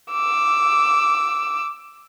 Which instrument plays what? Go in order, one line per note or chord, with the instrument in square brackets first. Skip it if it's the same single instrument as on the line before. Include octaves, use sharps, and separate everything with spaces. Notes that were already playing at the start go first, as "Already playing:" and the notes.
[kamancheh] D6 E6